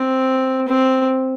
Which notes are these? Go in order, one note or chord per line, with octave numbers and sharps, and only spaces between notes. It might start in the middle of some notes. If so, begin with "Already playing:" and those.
Already playing: C4
C4